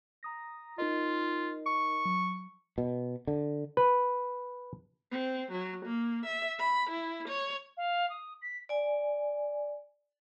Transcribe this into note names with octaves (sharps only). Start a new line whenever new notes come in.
A#5 D#6 A#6
D#4 F4 A#4 D#5
C#6
F#3
B2
D3
B4
C4
F#3
A#3
E5
B5
E4
C#5
F5
D#6
B6
D5 G#5